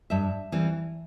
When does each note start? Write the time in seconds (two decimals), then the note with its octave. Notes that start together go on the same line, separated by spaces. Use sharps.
0.10 G2 E5
0.52 E3 G3 C4